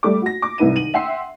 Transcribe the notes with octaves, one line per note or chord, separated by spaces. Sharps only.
G3 A3 D6
F#4 A#6
D6
C2 G#2 E4 B4 D#7
D#3 D#7 F#7
E5 F#5 G5 C6 E6 C7